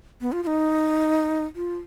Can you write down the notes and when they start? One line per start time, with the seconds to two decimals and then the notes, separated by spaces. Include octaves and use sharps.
0.21 B3
0.32 F4
0.43 F4
0.47 D#4
1.56 F4